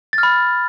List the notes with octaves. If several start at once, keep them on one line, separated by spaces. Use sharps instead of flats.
A6
F6
B5